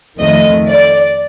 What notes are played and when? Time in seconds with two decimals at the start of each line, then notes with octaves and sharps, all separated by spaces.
0.19 F2 D#3 A3 D#5
0.69 D5